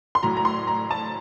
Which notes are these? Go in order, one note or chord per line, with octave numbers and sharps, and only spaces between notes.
C6
A2 F#3 A#5
A#5
C6
A#5
A5